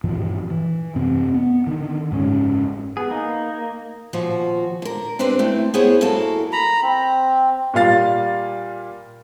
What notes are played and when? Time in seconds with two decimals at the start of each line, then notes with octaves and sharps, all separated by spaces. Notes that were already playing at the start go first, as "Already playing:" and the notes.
0.04 G2 A#2 E3 F3
0.50 E3
0.95 F#2 C3 C4
1.34 B3
1.67 D3 D#3
2.11 F#1 G#2 C3 C#4
2.97 B3 G#4
3.11 A#3 D#4
4.13 D#2 A#2 F3 F#4
4.82 D3 A#4
5.19 C4 D4 G4 B4 C5
5.39 A3 C4 E4
5.74 B3 E4 G#4 C5 C#5
6.01 F#2 A#3 E4 F#4 A4 A5
6.52 A#5 B5
6.83 C4
7.74 A#2 G3 F4 F5 A6